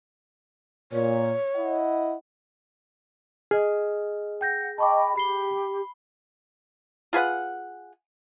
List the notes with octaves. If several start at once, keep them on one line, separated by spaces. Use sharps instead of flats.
A#2 C#5
E4 D#5 F#5
G#4 D#5 F6
F#5 G5 G6 A#6
D#5 G5 A5 B5 C#6 D6
G4 B5 C7 G7
F4 G#4 B4 F#5